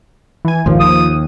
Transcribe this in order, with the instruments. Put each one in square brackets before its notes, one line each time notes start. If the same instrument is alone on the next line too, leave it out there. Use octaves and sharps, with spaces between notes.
[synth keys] E3 G#5
[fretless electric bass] G#1 D#2 A#2 [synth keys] F3
[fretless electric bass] D#2 [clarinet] D#6